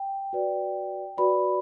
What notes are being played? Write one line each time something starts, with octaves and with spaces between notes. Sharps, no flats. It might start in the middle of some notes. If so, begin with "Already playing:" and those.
Already playing: G5
F#4 B4 D5
F#4 B4 D5 B5